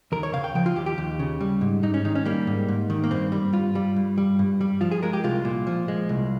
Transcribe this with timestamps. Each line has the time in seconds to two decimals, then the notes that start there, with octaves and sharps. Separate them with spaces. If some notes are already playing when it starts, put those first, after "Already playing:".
0.12 D#2 A#4
0.23 C#5
0.33 C#3 F5
0.44 G5
0.55 F3 G5
0.66 F4
0.76 D#2 G4
0.86 G4
0.98 D#2
1.19 C#3
1.40 G3
1.61 G#2
1.83 G#2 D#4
1.94 C#4
2.05 D#3 D#4
2.15 C#4
2.25 G3 A#3
2.47 G#2
2.68 G#2
2.90 D#3
3.03 A#3
3.11 G2 C4
3.32 G3
3.53 G2 F4
3.75 G3
3.96 G2
4.18 G3
4.39 G2
4.61 G3
4.81 F3 F4
4.91 G#4
5.03 G#3 A#4
5.13 G4
5.24 C2 F4
5.45 A#2
5.67 F3
5.88 G#3
6.09 C2